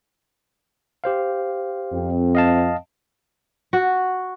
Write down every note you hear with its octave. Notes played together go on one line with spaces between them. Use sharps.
G4 C5 F5
F2 C4
D#5 F5 A5
F#4